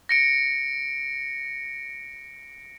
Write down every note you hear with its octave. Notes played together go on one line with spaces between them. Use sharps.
A#6 C#7 D7